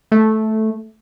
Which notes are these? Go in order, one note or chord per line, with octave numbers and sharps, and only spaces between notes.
A3